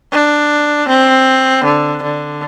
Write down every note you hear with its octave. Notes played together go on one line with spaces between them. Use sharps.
D4
C4
D3
D3